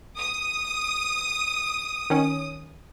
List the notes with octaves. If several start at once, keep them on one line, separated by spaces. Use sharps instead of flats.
D#6
D#3 C#4